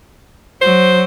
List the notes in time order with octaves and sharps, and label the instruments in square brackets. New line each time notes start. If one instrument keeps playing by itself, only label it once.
[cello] F#3 [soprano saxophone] C5